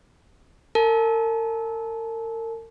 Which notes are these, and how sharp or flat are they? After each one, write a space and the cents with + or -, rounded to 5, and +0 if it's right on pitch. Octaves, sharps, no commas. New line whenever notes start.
A#4 -40 A5 -35